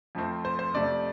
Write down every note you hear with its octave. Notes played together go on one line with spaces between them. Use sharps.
F2 F3 A3 C4
C5
C5
F2 C3 A3 D5